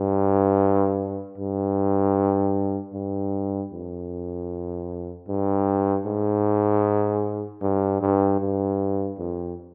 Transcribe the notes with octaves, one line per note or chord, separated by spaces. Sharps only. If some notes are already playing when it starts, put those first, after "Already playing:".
Already playing: G2
G2
G2
F2
G2
G#2
G2
G2
G2
F2